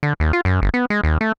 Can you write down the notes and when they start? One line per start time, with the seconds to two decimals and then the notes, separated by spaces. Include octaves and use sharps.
0.03 D3
0.20 D#2
0.33 F4
0.45 F#2
0.62 G1
0.74 B3
0.90 G#3
1.03 D#2
1.21 A3